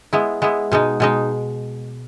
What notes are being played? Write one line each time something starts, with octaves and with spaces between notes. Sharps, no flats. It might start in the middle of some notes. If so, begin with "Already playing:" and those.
G#3 B3 E4
G#3 B3 E4
B2 G#3 D#4
B2 G#3 D#4